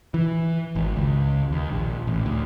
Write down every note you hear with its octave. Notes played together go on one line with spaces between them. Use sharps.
E3
G#1
C#2
D#2
A#1
A1
D2